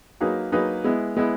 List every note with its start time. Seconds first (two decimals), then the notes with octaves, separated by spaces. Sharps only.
0.21 F#3 A#3 D#4 G#4 B4
0.52 F#3 A#3 D#4 G#4 B4
0.84 G#3 B3 E4
1.17 G#3 B3 E4